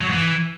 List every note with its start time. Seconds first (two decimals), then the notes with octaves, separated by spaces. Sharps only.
0.01 F#3
0.07 G#2
0.13 E3